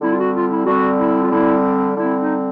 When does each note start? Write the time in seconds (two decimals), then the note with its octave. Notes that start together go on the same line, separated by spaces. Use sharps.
0.01 D3 G3 C4 E4
0.11 F4
0.17 F#4
0.33 F4
0.50 E4
0.66 D3 G3 C4 F#4
1.00 E4
1.22 F4
1.32 D3 G3 C4 E4
1.97 D3 G3 C4 E4
2.19 D#4